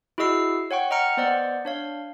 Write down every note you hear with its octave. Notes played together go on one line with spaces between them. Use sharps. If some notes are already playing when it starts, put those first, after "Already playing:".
E4 F#4 G#4 D#5 E6 C7
C#5 F#5 G5 C#6
D#5 F#5 G5 A#5 F6 C#7
B3 C5 D5 D#5 F#5
D4 C#5 F5